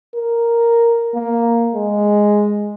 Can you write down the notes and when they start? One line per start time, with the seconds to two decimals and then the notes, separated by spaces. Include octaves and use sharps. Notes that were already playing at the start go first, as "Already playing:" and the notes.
0.15 A#4
1.14 A#3
1.75 G#3